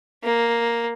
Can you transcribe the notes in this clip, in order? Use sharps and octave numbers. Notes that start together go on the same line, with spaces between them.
A#3